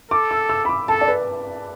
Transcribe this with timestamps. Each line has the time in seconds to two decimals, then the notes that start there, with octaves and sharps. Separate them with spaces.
0.11 A4 D6
0.31 E6
0.49 E6
0.65 B5
0.69 D6
0.88 A4 A5
1.01 D5
1.08 B4